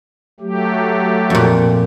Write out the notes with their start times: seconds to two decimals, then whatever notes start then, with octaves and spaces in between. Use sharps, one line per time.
0.40 F#3 A3 G4
1.30 F2 A#2